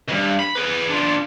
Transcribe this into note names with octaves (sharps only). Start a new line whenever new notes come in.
C#2 G2
B5
G#4 B4
D4 F4